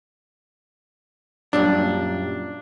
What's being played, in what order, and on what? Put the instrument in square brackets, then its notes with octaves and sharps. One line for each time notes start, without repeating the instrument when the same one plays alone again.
[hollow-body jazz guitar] F#2 A#2 G3 [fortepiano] D4